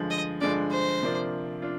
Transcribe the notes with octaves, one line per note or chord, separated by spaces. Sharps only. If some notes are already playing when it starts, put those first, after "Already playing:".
Already playing: G2 D3 F3 G#3
D#5
G2 D3 F3 G#3 D5
C5
C3 F3 A#3 D4 F4
D4 F4